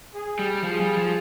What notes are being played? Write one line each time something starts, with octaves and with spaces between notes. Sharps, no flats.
G#4
G3
F3 G#4
G3
F3